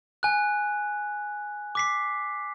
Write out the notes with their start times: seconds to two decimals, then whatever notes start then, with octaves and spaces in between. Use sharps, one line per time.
0.23 G#5 F#6
1.75 D6 B6 C7